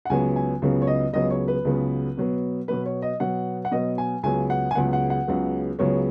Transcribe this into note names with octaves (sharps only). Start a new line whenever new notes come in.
F#5
C#2 C#3 F#3 B3 G#5
G#5
C#2 C#3 F#3 B3
C#5
D#5
C#2 C#3 F#3 B3 D#5
C#5
B4
C#2 C#3 F#3 B3
B2 F#3 B3
B2 F#3 B3 B4
C#5
D#5
B2 F#3 B3 F#5
F#5
B2 F#3 B3 D#5
G#5
C#2 C#3 F#3 B3 G#5
F#5
G#5
C#2 C#3 F#3 B3 F#5
F#5
F#5
C#2 C#3 F#3 B3
C#2 C#3 F#3 B3 C#5